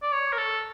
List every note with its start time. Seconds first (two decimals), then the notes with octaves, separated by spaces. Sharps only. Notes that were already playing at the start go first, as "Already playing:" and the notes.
0.03 D5
0.12 C#5
0.33 A#4
0.37 A4